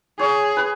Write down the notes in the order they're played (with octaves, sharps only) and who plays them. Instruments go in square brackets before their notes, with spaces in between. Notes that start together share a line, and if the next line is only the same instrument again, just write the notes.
[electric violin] G#4 [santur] C#5
[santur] B4